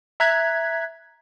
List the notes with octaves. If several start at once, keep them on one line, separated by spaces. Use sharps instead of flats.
E5 A#5 F#6 G#6 B6